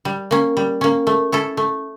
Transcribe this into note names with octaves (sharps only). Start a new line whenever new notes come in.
G3
A#3 C#4
G3
A#3 C#4
A3
C#4 E4 A4
A3